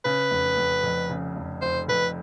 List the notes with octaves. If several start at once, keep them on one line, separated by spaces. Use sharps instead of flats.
C#3 B4
F1
F1
F2
C#3
F1
F1 C5
F2 B4